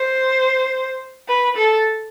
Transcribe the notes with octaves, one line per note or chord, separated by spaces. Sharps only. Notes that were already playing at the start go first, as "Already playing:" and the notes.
Already playing: C5
B4
A4